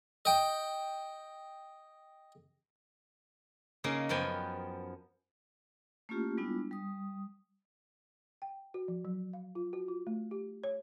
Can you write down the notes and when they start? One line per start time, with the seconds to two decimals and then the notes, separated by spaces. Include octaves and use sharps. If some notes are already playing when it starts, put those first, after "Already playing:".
0.25 D#5 G5
3.84 C#3 A#3 D#4 G#4
4.09 F#2 F3 B3 G5 G#5
6.09 A3 A#3 C#4 E4 F4 G4
6.37 G3 G#3 B3 D4 E4 F4
6.71 G3 D#6
8.42 G5
8.74 F#4
8.88 F3
9.05 F#3
9.33 F5
9.55 F4
9.73 F#4
9.88 F4
10.07 A3
10.31 G4
10.64 C#5